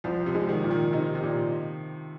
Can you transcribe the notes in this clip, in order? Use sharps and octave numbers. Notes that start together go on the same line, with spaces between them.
C2 F3
C3
G#3
D#3
A#2
D#3
C3 D#4
C3
A#2